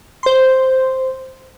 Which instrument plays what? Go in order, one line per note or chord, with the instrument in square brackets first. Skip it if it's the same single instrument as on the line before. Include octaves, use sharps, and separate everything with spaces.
[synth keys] C5 C6